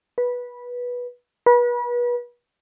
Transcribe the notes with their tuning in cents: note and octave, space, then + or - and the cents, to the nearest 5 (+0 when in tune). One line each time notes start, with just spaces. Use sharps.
B4 -15
B4 -35